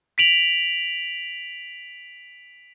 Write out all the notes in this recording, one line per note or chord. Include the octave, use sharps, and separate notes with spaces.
B6 D7 F7 F#7